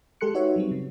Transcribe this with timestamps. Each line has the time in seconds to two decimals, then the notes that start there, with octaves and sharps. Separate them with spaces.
0.21 G#3 G4 A4 C6 F#6 C#7
0.34 D#4 F#4 B4 C#5 E5
0.56 F#3 G3 C4
0.71 C#3